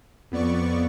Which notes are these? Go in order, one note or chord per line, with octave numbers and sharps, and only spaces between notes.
F2 B3 D5 C#6